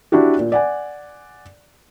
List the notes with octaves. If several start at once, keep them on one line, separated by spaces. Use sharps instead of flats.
D4 E4 F#4 G4
A#2
D5 F#5 G#5